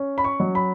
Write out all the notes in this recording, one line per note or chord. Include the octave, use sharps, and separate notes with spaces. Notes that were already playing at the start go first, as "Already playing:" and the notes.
Already playing: C#4
B5
C#6
F#3
B5